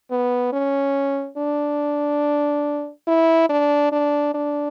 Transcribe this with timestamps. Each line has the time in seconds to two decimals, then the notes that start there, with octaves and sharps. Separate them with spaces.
0.11 B3
0.53 C#4
1.37 D4
3.07 E4
3.49 D4
3.92 D4
4.34 D4